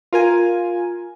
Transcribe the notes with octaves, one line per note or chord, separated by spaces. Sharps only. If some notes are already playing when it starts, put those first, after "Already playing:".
F4 A#4 G#5